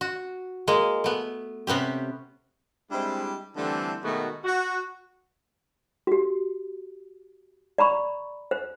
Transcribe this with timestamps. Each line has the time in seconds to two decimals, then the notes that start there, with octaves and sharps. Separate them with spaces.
0.01 F#4
0.68 G#3 A#3
1.04 A3 B3
1.67 C3 B3 C#4 G4
2.91 G3 G#3 C4 D4 E4
3.56 D3 E3 G3 A3 C4 D4
4.04 B2 D#3 G#3 A3 B3 F#4
4.44 F#4
6.07 F#4 G4
7.78 D5 A#5 B5 C#6
8.51 C5